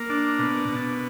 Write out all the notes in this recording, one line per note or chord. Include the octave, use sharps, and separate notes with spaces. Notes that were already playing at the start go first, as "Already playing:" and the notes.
Already playing: A#3
D4
B2
B2